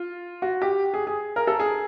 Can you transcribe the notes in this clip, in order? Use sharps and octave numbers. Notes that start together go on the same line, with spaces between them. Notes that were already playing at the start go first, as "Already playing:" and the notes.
Already playing: F4
F#4
G4
G#4
G#4
A#4
A4
G#4